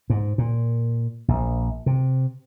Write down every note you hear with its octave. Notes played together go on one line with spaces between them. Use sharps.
G#2
A#2
A#1
C3